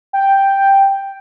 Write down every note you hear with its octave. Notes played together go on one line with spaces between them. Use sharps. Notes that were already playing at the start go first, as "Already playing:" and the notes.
G5